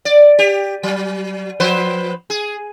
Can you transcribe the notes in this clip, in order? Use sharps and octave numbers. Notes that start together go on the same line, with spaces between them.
D5
G4
F#3
F3 B4 C5
G#4